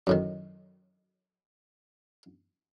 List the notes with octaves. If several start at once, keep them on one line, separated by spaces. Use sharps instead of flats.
F#2 A2 D#3